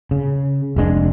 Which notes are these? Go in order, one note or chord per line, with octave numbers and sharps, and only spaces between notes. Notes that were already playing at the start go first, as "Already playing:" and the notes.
C#3
F1 G#3 D4